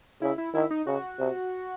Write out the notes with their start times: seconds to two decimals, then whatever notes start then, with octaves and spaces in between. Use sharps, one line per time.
0.21 C#3 E4
0.38 E4
0.54 D#3 E4
0.71 D#4
0.87 C#3 F#4
1.19 C3